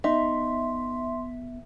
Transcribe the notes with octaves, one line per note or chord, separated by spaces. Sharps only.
B3 D#4 E5 C6